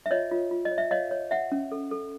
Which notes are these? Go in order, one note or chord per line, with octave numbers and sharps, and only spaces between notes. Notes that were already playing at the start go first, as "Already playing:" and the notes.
E5
F4 C#5 D#5
F4
F4
D#5
C#5
E5
C#5 D#5 F5
C#5
C#5 E5 F#5
C#4
A4
A4